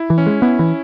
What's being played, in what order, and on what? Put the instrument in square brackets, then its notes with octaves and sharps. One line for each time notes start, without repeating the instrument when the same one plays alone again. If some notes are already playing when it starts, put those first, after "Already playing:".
Already playing: [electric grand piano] E4
[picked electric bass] E3
[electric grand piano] C#4
[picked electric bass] G#3
[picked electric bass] B3 [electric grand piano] E4
[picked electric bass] E3